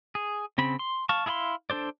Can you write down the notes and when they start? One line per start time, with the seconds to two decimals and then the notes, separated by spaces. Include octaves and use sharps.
0.15 G#4
0.58 C#3 C4 B5
0.79 C6
1.09 F5 A5 C#6
1.26 E4 G#4 F5 B5 C6
1.70 D4 A4 C5 D5